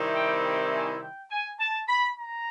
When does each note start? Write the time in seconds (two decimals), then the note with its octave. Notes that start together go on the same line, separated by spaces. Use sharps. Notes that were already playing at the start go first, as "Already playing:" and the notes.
Already playing: C3 D#3 G3 C4 E4
0.15 G5
0.43 G5
0.72 G#5
1.02 G5
1.30 G#5
1.59 A5
1.87 B5
2.17 A#5